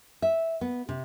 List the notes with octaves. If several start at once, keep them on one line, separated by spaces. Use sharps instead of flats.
E5
B3
C3